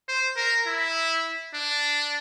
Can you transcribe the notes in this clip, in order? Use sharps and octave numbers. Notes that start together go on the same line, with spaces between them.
C5
A#4
E4
D4